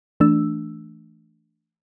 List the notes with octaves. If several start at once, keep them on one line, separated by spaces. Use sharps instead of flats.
E3 A3 D4 E6